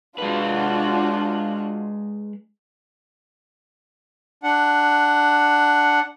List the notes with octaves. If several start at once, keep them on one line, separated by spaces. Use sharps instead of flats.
G#3 D4 F4 F#4 B4
D4 F#5